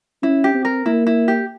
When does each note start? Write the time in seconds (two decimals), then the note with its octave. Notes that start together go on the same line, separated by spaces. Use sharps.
0.23 C#4 E4
0.44 G4
0.54 C4
0.65 A#4
0.85 A#3 E4
1.07 E4
1.28 G4